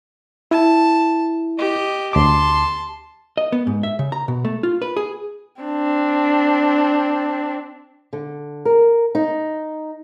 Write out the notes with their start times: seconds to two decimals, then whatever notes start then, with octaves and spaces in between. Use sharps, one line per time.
0.51 E4 A5
1.58 G4 D#5
2.13 D2 A5 C6 D6
3.37 D#5
3.52 B3
3.67 G#2
3.83 E5
3.99 C#3
4.12 A#5
4.28 B2
4.45 A3
4.63 F4
4.82 B4
4.97 G#4
5.62 C4 D4
8.13 D3
8.65 A#4
9.15 D#4